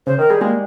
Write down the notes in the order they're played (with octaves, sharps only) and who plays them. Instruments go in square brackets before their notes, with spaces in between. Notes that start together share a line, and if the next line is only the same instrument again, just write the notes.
[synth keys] C#3 [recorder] C5
[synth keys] D#3 [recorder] A#4
[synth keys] G3 [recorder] G#4
[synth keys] G#3 [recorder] A#3